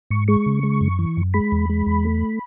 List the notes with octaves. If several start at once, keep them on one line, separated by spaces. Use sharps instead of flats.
G#2 C#6
G#3 C#6
C#3
G#3
F#2
E3
F#2
G#3 B5
E2
G#3
E2
A3